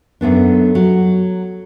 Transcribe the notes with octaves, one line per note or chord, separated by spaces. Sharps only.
F#2 A3 B3 D4
F#3